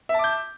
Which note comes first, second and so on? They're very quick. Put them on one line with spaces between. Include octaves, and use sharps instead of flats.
E5 A5 D6 G6